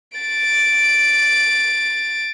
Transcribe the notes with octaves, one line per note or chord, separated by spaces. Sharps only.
A6 D7